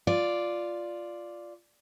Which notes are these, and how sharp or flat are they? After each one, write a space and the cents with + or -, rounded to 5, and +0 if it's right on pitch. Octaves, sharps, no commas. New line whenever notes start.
F4 +0 D5 +0